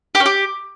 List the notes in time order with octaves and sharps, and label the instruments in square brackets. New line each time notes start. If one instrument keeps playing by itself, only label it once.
[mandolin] G4
C#4
G4